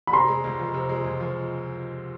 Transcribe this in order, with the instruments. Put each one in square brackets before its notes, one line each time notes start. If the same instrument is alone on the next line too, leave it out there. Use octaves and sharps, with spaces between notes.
[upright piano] B5
[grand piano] C3 [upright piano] A#5 C6
[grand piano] G#3
C#2
F3
C3
G#3
C#2
F3